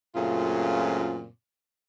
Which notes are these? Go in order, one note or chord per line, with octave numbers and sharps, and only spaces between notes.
F#2 A#2 C#3 A3 C4 F4